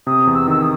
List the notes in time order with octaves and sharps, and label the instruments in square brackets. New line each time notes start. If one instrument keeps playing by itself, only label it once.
[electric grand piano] C3 [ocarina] D#6
[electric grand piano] E2
[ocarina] E6
[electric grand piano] D#3 [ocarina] E6
[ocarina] D#6